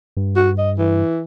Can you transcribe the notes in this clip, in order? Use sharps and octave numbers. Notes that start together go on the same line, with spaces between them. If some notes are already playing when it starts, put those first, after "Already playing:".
G2
F#4
D#5
E3